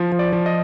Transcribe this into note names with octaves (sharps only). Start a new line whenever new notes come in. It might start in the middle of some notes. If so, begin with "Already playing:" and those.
Already playing: F3
F3
D5
F3
D#5